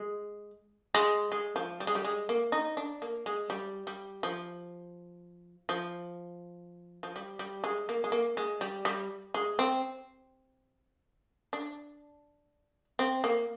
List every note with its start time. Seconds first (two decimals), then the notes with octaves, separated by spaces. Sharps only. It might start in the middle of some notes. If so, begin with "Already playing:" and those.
Already playing: G#3
0.95 G#3
1.32 G#3
1.56 F3
1.80 G3
1.87 G#3
1.95 G3
2.04 G#3
2.29 A#3
2.52 D#4
2.77 D4
3.02 A#3
3.26 G#3
3.50 G3
3.87 G3
4.23 F3
5.69 F3
7.03 F3
7.16 G3
7.39 G3
7.64 G#3
7.89 A#3
8.04 G#3
8.12 A#3
8.37 G#3
8.61 G3
8.85 G3
9.34 G#3
9.59 C4
11.53 D4
12.99 C4
13.24 A#3